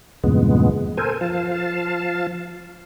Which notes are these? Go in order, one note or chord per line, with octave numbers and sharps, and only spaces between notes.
E2 G2 A#2 C#3 G#3 B3
A4 A#4 C5 G#5
F3 F5 A5